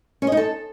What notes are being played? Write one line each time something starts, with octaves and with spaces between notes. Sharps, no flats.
C#4
D#5
D#4
A4